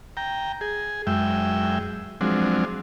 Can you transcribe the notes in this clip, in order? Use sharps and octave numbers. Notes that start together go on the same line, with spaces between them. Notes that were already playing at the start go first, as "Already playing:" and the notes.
G5 A#5
G#4
F#2 G#3 E5 G5
F3 F#3 G#3 C4 D4